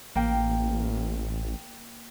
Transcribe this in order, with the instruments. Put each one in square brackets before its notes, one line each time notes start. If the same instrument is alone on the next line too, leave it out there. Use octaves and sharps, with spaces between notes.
[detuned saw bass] A1 [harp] A#3 G5